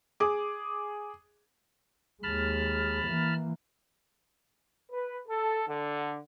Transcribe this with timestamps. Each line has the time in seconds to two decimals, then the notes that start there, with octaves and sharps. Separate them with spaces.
0.20 G#4 D6
2.23 D#2 G#3 A5 B5 F6
3.06 E3 A#3
4.92 B4
5.28 A4
5.68 D3